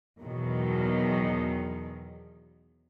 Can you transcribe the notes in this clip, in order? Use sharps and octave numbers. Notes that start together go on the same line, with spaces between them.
E2 B2 D#3 F#3